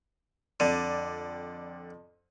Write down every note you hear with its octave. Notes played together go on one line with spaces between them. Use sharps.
F2 D3 D5 D#7